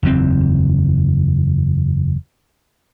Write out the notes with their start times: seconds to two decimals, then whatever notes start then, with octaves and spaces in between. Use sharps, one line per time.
0.03 F#1 E2 A2 C4